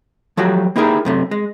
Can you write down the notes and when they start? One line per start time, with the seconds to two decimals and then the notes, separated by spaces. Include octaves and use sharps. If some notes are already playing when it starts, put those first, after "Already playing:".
0.37 F3 F#3 A3 F#4 G4
0.76 A#3 D#4 E4 G4 G#4 A#4
1.05 F#2 C3 A3
1.31 G#3